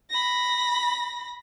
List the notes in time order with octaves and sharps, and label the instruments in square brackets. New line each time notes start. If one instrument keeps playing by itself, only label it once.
[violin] B5 A#6